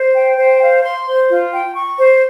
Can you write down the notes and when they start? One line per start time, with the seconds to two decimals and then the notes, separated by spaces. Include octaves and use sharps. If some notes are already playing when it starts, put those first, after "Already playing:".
Already playing: C5
0.14 G5
0.38 C5
0.60 F5
0.83 C6
1.06 C5
1.29 F4
1.52 G5
1.75 C#6
1.98 C5